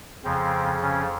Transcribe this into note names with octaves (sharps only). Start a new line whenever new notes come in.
F2 C#3 F3 C4
C#3 C#4